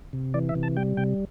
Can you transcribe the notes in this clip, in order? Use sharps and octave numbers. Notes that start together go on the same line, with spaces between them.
C3
E3 D5
E5
C3
A5
G3 G5
C3 G5